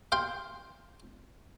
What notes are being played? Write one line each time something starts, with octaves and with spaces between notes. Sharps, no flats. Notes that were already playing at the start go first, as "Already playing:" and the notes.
F5 G5 C6